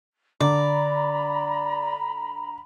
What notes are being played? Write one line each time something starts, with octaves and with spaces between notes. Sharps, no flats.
D3 D5 A#5 B5